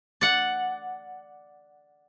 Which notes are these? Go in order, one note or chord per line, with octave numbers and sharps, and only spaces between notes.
D5 F#5